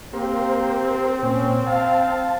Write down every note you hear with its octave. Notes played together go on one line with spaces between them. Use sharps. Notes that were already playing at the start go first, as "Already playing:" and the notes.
A#3 C4 G4 A#4 C5
A#2 C#4
F5 A5